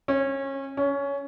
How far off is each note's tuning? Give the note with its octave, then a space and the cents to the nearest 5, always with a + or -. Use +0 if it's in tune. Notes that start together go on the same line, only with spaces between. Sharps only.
C#4 -25
C#4 +15